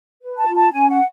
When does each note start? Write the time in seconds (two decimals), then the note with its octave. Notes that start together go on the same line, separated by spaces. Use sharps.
0.22 B4
0.38 A5
0.48 F4
0.55 A5
0.72 C#4 G#5
0.89 F#5